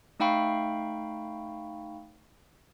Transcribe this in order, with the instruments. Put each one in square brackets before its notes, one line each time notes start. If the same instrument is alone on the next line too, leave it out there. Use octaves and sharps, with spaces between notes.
[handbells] A3 D#4 F5 G5 B5 C#6